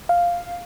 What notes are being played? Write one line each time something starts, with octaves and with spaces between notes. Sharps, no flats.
F5